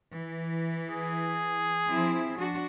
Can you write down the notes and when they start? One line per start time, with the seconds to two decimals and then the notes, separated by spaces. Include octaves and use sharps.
0.15 E3
0.90 G#4
1.89 F3 C4 E4
2.38 D4 F#4